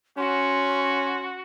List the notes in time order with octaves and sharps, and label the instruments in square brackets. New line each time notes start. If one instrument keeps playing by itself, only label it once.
[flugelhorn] C#4 [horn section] F#4 [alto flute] C6